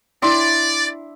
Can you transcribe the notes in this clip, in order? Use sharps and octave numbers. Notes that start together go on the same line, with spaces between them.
D4 E4 D5 G5 C6